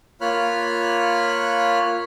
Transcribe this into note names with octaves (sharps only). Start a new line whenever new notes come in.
A#3 F4 C#5 B5 F6 F#6